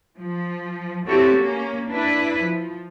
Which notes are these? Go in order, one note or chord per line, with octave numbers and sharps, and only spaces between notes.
F3
C4 E4 F#4 G4 A4 C#5
A#3 C#4
D4 E4 B4
F3